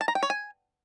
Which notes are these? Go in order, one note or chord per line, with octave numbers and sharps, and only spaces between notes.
A5
A#5
G5
C#5
G#5